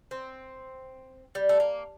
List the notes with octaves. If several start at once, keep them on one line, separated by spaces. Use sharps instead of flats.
C4
G3
A3
A#3